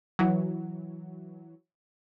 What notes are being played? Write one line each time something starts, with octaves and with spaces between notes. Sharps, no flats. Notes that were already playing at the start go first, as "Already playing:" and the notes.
E3 F#3